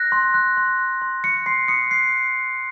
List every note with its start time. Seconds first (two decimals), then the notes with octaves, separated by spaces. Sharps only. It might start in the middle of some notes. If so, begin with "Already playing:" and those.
Already playing: F#6 A#6
0.12 C6
0.34 F#6
0.57 C6
0.80 F#6
1.02 C6
1.24 C6 C#7
1.46 C6 C7
1.68 D#6 C#7
1.91 F#6 C7